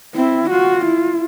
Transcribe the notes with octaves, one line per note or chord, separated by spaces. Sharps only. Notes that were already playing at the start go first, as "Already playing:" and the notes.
C4 E4
F4 F#4
E4